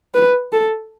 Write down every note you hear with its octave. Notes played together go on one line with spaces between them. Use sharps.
B4
A4